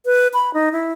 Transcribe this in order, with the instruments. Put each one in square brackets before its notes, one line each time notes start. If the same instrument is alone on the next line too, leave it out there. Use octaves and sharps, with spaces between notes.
[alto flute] B4
B5
D#4
E4